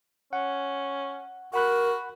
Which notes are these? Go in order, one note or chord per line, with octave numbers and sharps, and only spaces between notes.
C#4 F#5
F#4 A#4 F#5 B5 F#6